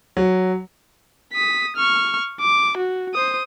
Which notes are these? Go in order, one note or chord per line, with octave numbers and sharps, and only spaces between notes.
F#3
D#6 B6
C#6 F6
D6
F#4
C5 D#6